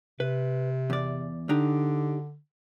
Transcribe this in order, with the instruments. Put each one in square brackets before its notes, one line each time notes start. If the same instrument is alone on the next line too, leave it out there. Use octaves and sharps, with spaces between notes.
[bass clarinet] C3 [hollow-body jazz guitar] B4
[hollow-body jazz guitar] E2 D5
[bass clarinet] D3 [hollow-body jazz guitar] D4 D#4 G4